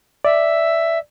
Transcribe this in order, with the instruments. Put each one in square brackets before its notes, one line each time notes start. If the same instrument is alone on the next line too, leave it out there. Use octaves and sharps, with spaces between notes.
[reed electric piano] D5 [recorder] E5